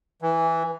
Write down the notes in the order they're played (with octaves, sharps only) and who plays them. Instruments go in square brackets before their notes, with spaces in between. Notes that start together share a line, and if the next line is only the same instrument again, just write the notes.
[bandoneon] E3